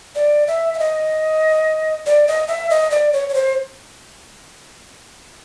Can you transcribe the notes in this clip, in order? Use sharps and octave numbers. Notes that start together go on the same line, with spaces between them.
D5
E5
E5
D#5
D5
D#5
E5
D#5
D5
C#5
C#5
C5